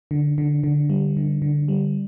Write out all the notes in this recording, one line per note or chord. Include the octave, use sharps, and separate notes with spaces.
D3
D3
D3
G3
D3
D3
G3